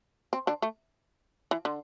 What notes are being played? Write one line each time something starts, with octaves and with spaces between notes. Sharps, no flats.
C4
D3 D4
A3
E3
D3